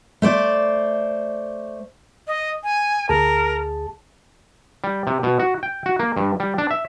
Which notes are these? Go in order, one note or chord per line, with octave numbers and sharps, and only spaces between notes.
A3 C5 D5
D#5
G#5
D2 G#4 A#4 A5
G3
C3
B2
F#4
G5
F#4
A#3
G2
G3
D4
E5